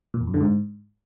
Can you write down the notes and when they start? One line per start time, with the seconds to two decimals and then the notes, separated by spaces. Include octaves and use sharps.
0.14 A#2
0.21 E2
0.27 F#2
0.34 D3
0.41 G#2